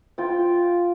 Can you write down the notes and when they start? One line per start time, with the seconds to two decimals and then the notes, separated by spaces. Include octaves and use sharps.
0.18 F4 F5 G5